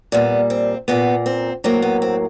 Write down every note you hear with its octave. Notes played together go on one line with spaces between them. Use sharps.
A#2 G3 A#3 B3
C4
A#2 G3 A#3 B3
C4
A2 F#3 A#3 C4
B3
C4